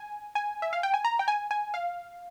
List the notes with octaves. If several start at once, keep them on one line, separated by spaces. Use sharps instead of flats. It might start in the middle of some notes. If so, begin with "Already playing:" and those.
Already playing: G#5
G#5
E5
F5
G5
G#5
A#5
G5
G#5
G#5
F5